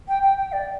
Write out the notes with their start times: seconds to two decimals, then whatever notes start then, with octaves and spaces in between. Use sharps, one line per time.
0.08 G5
0.23 G5
0.38 G5
0.52 D5